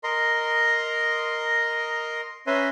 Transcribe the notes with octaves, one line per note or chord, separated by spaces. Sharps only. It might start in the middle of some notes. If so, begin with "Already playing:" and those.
A#4 D#5 A#5 C6
C#4 B4 E5 G#5 A#5 C6